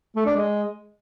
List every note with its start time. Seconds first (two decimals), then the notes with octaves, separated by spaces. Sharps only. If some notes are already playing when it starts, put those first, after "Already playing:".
0.16 A3
0.26 D4
0.36 G#3